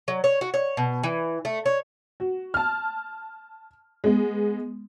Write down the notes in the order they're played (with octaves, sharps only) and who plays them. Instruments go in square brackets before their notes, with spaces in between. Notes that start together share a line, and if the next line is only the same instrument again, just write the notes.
[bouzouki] F#3
C#5
F#4
C#5
B2
E3
A3
C#5
[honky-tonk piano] F#4
A5 F6
G#3 B3